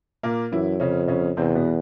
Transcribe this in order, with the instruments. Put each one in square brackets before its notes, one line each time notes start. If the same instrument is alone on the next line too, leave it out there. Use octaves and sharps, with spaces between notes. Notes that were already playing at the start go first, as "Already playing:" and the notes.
[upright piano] A#2 A#3
[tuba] F#2 [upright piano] E3 E4
[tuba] F2 [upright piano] C#3 C#4
[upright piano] C#3 C#4
[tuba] E2 [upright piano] C3 C4
[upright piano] B2 B3